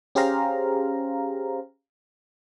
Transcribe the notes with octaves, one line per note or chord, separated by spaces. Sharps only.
C#4 G4 G#4 C5 F5 A#5